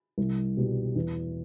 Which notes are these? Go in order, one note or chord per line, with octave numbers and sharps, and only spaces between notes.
C2
B2 G3
E2